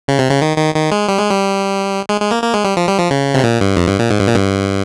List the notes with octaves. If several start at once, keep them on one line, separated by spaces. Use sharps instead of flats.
C#3
C3
C#3
D#3
D#3
D#3
G#3
G3
G#3
G3
G#3
G#3
A#3
A#3
G#3
G3
F3
G3
F3
C#3
C3
A#2
G2
F2
G2
A#2
G#2
G2
A#2
G2